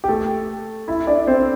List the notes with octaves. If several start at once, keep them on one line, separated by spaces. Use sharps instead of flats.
G4
A3 A4
E4 E5
D4 D5
C4 C5